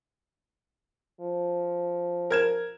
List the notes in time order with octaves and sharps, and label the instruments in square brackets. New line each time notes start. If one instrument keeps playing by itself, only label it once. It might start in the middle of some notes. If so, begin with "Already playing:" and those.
[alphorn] F3
[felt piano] A#4 G#6 E7